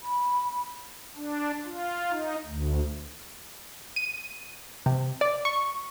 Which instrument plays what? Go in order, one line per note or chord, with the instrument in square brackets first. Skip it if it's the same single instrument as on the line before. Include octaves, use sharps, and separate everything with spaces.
[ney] B5
[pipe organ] D4
F4
D#4
D2
[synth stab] D#7
C3
D5
C#6